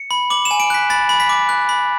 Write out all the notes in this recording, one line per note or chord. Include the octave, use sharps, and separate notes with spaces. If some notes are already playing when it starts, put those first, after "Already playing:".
Already playing: C#7
B5
D6 F#7
E7
G#5
D7
F#6 B6
B5 A6
B5
B6
D6
F#6
B5